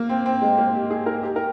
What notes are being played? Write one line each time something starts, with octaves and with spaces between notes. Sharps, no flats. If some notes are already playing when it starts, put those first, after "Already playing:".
Already playing: A#3
C4
C4
G#3
A#3
G4
G#4
A#4
G4
A#4